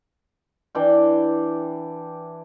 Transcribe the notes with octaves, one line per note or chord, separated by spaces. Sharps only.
E3 D4 D5 G5